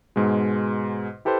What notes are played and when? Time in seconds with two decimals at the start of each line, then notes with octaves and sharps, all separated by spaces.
0.16 G#2 B2 G#3
1.25 E4 G4 A4 B4 C5